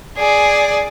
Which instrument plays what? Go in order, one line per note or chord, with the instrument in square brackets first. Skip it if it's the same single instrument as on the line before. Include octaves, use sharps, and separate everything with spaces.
[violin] G#4 D5